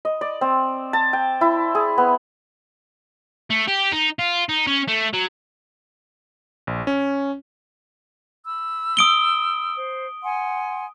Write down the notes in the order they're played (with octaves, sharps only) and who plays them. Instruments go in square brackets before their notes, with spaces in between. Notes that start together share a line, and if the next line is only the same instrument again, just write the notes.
[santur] D#5
D5
C4
A5
G5
E4
G#4
B3
[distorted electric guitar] A3
G4
D#4
F4
D#4
C#4
A3
F#3
[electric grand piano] A#1
C#4
[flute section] B5 E6
[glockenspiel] D#6 D7 G7
[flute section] C5
F#5 G#5 C6